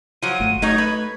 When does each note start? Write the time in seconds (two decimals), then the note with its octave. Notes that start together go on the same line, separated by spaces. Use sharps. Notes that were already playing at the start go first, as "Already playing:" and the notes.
0.22 F3 F#3 D#7
0.40 G1 A3
0.62 F#3 A3 D#4 C#5 G#6
0.78 B4